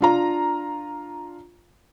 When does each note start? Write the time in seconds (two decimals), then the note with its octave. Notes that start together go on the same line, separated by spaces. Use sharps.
0.01 D4 F4 A#5